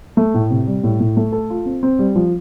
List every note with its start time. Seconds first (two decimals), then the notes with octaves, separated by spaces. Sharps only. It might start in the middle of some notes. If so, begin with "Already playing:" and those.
0.17 A3
0.34 A2
0.50 C3
0.67 G3
0.84 A2
1.00 A2
1.17 A3
1.32 A4
1.50 F4
1.65 C4
1.83 C4
1.99 G3
2.16 F3